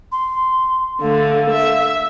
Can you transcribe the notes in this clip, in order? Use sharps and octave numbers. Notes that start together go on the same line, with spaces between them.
C6
D3 A3 F5
E5